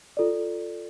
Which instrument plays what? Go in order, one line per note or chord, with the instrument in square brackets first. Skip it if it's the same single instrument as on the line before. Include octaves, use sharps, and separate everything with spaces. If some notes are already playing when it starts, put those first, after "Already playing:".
[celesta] F4 A4 D5